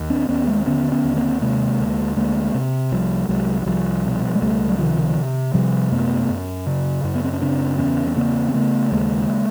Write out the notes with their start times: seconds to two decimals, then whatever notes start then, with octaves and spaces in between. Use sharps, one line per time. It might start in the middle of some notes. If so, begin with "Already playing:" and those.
Already playing: D#2
0.10 C4 D4
0.28 D#2 B3 C#4
0.48 G#3 A#3
0.60 C4
0.66 D3 B3 C#4
0.92 B3 C#4
1.04 D#2
1.16 A#3 C4
1.41 C3 G#3 A#3
1.79 D2
2.16 D2 G#3 A#3
2.54 C3
2.92 C2 F3 G3
3.29 C2 F#3 G#3
3.61 F#3
3.66 C2 F3 G3
4.05 B2
4.35 G#3
4.42 C#2 G3 A3
4.68 F#3
4.79 C3 D#3 F3
5.17 C3
5.54 C3 F3 G3
5.91 F#2 A3 B3
6.29 F#2
6.66 C#3
7.04 F#2
7.15 B3
7.24 C4
7.33 C#4
7.41 C#3 C4 D4
7.79 E2 B3 C#4
8.07 B3
8.16 C#3 A#3 C4
8.48 C4
8.54 C#3 A3 B3
8.92 D#2 G#3 A#3